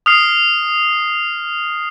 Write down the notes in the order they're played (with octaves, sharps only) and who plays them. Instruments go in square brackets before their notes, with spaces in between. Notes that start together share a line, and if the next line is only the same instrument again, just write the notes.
[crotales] D#6 F6 C7